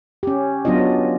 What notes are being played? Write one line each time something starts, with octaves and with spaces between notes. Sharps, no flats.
C#4 G4
F#3 B3 D4 F4 D#5